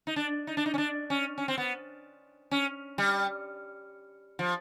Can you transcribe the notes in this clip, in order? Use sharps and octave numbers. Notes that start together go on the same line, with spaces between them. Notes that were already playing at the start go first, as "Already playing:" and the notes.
D#4
D4
D#4
D4
D#4
C#4
D4
C#4
C#4
C4
B3
C#4
G3
F3